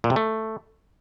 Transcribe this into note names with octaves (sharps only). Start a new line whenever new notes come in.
A#2
C3
A3